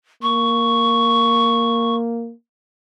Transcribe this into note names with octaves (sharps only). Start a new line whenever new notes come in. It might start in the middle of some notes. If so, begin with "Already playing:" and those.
A#3 C#6